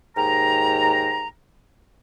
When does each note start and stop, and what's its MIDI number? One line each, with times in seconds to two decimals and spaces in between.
0.17 1.28 39
0.17 1.28 44
0.17 1.28 79
0.17 1.28 82